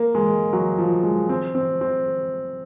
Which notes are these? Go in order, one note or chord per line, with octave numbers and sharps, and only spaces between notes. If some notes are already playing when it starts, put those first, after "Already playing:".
Already playing: A#3
G#3
F#3
F3
G#3
C4
C4
C4